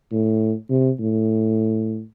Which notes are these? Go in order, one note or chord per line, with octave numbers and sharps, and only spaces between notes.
A2
C3
A2